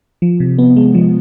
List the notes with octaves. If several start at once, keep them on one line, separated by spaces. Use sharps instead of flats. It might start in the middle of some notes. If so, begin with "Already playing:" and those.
F3
C3
B3
G#3
F3